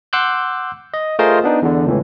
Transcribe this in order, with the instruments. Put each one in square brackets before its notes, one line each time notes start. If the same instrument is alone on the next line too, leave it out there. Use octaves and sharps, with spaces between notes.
[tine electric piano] F#5 C6 D6 E6 F#6 G6
D#5
A3 F4 G#4 A#4 C5 D#5
B3 D4 D#4
E2 D3
C#2 A2 E3